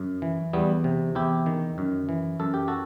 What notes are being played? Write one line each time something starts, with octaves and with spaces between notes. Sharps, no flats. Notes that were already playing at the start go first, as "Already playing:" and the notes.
Already playing: F#2
E3
E2 G3 B3
C3
E2 E4 G4
D#3
F#2
E3
F#2 A4
G4
F#4 A4